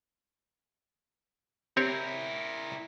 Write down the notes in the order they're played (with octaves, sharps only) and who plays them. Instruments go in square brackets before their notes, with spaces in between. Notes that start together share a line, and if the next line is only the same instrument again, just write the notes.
[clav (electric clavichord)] C4 G4 C#5 [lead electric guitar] E4 A#4